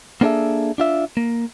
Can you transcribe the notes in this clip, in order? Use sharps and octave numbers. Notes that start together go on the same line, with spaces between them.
A#3 B3 D4 G#4 A4 E5
D4 F4 E5
A#3